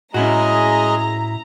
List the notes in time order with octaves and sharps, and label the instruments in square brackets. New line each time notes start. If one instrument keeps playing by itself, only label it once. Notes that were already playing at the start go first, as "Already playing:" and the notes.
[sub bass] A2 [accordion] G#3 G#4 D#5 [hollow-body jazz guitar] C#4 E4 F#4 [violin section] A#5